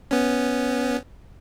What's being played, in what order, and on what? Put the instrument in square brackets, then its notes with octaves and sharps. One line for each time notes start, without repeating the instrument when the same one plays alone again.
[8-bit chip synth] B3 C#4